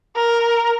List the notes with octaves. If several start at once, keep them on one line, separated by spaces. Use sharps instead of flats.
A#4